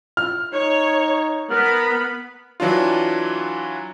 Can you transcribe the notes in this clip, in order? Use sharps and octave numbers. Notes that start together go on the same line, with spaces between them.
F6
D#4 C#5
B3 A#4 B5
E3 F#3 D4 F4